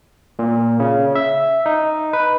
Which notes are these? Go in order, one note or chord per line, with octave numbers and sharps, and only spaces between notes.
A#2
C#3
E5
D#4
B4